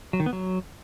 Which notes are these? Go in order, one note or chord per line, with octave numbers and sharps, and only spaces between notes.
F#3
D#3
B3
F#3